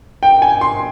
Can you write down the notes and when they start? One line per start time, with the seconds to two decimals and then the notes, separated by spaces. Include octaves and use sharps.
0.23 G5
0.42 G#5
0.61 C6